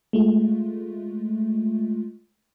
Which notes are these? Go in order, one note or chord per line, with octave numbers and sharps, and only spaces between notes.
G#3 A3 F4